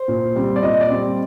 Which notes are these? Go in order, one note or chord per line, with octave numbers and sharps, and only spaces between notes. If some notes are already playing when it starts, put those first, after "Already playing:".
Already playing: C5
A#2
G3 C4
D5
A#2 D#5
D5
G3 C4